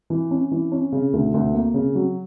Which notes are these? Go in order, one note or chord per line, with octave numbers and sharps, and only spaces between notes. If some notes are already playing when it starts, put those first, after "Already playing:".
E3
C#4
E3
C#4
C#3
D2
D2
A#3
C#3
F#3